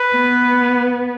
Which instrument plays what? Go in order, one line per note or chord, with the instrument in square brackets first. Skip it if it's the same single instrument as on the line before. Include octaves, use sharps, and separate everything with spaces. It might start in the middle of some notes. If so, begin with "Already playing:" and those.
Already playing: [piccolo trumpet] B4
[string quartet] B3